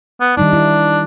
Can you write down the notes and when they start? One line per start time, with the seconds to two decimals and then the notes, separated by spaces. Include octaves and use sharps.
0.21 B3
0.37 D#3 G3 D4 D#4
0.53 E4